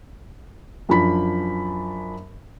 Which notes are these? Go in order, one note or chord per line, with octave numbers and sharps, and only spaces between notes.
F#2 F3 D4 B5 B6